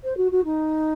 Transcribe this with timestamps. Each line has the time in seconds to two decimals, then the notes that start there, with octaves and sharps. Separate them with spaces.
0.04 C5
0.17 F#4
0.31 F#4
0.44 D#4